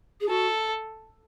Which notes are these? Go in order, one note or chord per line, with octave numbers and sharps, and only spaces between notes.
G#4
F#4 A4